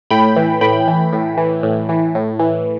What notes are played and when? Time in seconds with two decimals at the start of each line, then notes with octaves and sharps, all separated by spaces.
0.10 A2 G5 B5
0.36 E3
0.61 A2 G5 B5
0.88 E3
1.13 A2
1.37 E3
1.63 A2
1.89 E3
2.15 A2
2.39 E3